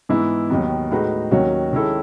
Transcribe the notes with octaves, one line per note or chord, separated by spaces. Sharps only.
G#2 E3 B3 E4
D#2 D#3 F#3 B3
A2 G#3 D#4 F#4 B4
D#2 D#3 F#3 C#4 F#4
D#3 G#3 C#4 E4 A4